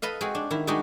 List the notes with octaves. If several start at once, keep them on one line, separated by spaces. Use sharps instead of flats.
A4 B4 D#5 F5
G#3 C4 F#4 G#4
D4
D#3 E4
G3 G#3 D4 D#4 F#4 G#4